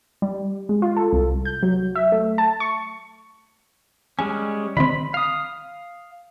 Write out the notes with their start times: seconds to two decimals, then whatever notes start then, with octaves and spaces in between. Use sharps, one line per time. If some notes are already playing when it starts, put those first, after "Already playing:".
0.22 G3
0.69 G#3
0.82 F4
0.97 A4
1.13 C2
1.45 G6
1.63 F#3
1.96 E5
2.12 A3
2.38 A5
2.60 C#6
4.19 G3 G#3 C#4 G#5
4.77 D3 D#3 C4 B5
5.14 F5 D#6